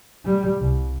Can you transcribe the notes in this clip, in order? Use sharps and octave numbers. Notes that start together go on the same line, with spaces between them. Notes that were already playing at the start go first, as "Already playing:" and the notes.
G3
C2